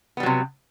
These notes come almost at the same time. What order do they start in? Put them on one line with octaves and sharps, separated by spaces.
B3 G3 F#3 C3